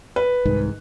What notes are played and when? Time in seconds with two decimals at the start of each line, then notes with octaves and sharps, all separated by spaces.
0.16 B4
0.45 C2 G#2 D#3